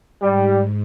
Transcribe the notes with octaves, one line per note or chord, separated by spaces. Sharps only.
G#2 G3